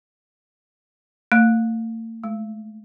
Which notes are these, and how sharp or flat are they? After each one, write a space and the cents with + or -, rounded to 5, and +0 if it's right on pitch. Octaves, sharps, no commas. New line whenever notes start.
A3 +45
A3 -45